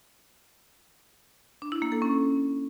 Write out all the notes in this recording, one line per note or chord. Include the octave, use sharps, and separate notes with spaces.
D4
E4
A#3
A4
C#4